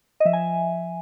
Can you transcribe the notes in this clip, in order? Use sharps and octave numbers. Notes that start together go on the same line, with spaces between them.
D#5
F3 E5
G#5